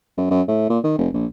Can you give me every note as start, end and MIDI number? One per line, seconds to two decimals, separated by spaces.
0.17 0.30 42
0.31 0.42 42
0.48 0.68 45
0.70 0.79 46
0.84 0.95 51
0.98 1.08 29
1.14 1.26 34